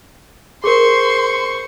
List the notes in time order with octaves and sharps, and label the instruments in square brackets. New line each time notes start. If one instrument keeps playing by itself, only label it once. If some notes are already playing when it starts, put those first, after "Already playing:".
[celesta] G#4 A#4 [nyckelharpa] C5 C#6 [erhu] C6